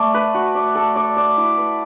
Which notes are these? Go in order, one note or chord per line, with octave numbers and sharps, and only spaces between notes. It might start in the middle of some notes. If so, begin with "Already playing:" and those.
Already playing: A3 D5
B4
F#4
D5
A4
D5
D5
E4
B4